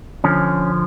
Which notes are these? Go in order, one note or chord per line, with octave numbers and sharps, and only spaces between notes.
D3 F3 C#4